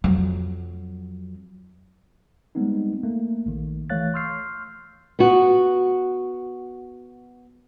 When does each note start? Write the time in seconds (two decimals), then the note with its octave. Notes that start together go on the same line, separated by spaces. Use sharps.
0.04 F2 F#3
2.55 G3 G#3 B3 C4 D#4
3.03 A3 A#3
3.46 A#1 D#3
3.90 E3 A3 C#5 F5 F#6 A6
4.14 C6 C#6 E6 F6 G6 C7
5.19 B3 F#4